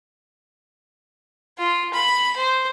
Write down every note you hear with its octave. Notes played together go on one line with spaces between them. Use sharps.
F4
B5
C5